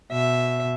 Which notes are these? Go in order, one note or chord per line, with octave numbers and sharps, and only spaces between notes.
B2 E5